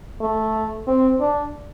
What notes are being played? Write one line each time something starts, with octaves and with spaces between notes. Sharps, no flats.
A3
C4
D4